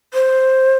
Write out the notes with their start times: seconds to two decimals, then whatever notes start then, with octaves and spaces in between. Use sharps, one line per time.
0.14 C5